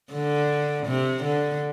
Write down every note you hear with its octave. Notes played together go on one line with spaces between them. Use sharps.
D3
C3
D3